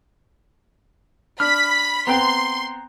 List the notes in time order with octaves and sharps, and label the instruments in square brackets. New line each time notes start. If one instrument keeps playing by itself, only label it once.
[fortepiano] D4 [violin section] B5 B6 [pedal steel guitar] F6
[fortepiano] B3 C4 G5 [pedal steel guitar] A#5 [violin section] C6